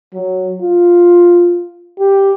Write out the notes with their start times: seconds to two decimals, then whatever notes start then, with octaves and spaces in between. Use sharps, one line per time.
0.14 F#3
0.61 F4
1.99 G4